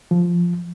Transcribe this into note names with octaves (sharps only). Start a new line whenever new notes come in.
F3